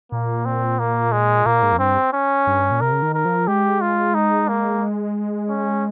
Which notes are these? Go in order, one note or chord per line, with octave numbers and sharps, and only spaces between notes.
A#2 A#3
C4
A#3
G#3
A#2 A#3
G#2
F2
G2 C4
C#4
G2
A#2
C3 A#4
C#3
D#3
A#4
F3
G#3 G4
F4
D#4
A#3
C#4